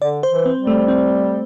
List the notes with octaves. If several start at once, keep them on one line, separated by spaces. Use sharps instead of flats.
D3 D5
C5
E3
C4
G3
A3
C4